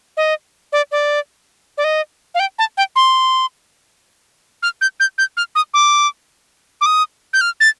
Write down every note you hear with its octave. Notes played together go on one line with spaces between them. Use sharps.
D#5
D5
D5
D5
D#5
F5
G5
A5
G5
C6
F6
G6
G6
G6
F6
D#6
D6
D6
D#6
G6
F6
A6